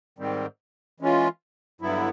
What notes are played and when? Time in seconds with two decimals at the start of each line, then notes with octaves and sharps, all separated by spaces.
0.19 G#2 D#3 G3 C4
1.00 E3 G#3 C#4 F4
1.81 G2 D3 F#3 B3 E4